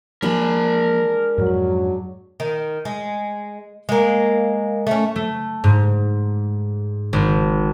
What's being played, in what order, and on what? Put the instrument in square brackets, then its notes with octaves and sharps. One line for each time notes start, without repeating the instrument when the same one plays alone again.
[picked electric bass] E3 F3 A#3 [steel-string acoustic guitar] G#3 D4 [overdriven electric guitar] A#4 B5
[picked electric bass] F2 G#2 [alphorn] F#3
[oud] D#3
G#3
G#3 A#3
A3 C#4
[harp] A3
G#2
G#1